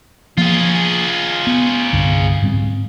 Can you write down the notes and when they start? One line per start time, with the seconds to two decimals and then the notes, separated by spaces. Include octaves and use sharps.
0.38 F3 A#3 F4 G#4
1.47 B3
1.93 C2 G2 D3
2.42 G#2 G3 C4